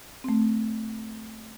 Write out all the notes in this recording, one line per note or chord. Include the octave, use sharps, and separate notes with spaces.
A3 C4